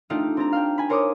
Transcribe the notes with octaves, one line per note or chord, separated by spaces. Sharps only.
A3 D4 D#4 F4 G4
C4 A5 A#5
F5 G5
G#5 B5
A#4 C5 C#5 D#5 D6 D#6